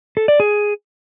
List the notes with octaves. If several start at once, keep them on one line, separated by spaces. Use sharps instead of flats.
A4
D5
G#4